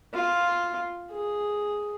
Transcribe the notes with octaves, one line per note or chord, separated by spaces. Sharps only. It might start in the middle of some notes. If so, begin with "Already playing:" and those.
F4
G#4